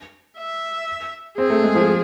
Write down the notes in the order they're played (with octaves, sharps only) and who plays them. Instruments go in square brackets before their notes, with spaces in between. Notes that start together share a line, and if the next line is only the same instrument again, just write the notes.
[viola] E5
[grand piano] C4 [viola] G#4
[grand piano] A3
G#3
F3